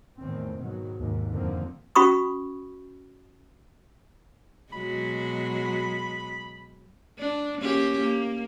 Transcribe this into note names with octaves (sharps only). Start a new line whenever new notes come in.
E2 A2 D#3 C4
G#2 B2 D#3 F#3
D#2 G#2
F2 D3 D#3 F3 A#3 C4
C#4 F#4 B5 C#6 D#6
B2 F#3 G#3 B5
D4
A#3 C#4 G4
A#3